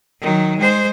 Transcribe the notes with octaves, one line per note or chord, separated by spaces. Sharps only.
D#3 F#3
G#3 C5